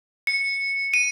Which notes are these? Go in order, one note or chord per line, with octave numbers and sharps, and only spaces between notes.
C#7
D#7